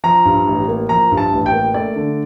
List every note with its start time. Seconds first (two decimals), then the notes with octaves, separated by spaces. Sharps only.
0.04 F3 A#5
0.25 G2
0.47 A1
0.68 A#3
0.89 F3 A#5
1.11 G2
1.17 A5
1.32 A1
1.46 G5
1.53 A#3
1.74 A3 D5
1.96 D3